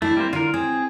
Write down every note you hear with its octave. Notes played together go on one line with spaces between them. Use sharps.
A3 C4 D4 E4
G3 A#3 C5
D3 F4 A#4
C4 G#4